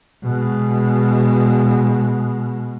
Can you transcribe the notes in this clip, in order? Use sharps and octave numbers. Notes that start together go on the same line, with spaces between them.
B2 G#3